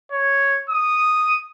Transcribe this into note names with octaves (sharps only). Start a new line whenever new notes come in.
C#5
D#6